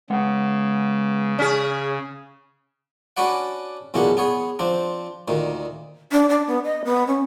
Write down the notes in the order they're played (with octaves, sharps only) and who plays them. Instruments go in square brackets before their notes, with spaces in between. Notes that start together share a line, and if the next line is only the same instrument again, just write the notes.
[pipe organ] C#3 [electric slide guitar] G#3 B3 F#5
[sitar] C#4 G#4
[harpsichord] C#4 D4 F#4 B4 D5 F#5
B1 E2 A#2 C#4 D4 F#5
B3 G#4 C#5
F3 C4 D4
D2 A#2 D#3
[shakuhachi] D4
D4
B3
D#5
B3
C#4